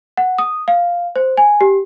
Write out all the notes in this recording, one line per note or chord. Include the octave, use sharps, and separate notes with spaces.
F#5
D#6
F5
C5
G#5
G4